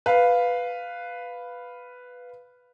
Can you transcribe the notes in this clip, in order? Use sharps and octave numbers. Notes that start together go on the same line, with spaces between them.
B4 F5